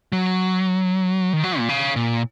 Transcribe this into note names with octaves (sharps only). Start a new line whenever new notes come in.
F#3
D#3
F#3
A#2
C#3
A#2